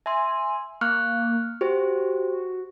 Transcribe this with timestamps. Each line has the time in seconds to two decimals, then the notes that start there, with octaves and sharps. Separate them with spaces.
0.06 E5 G#5 C6
0.81 A#3 C#6 F6 F#6
1.61 F#4 G4 C5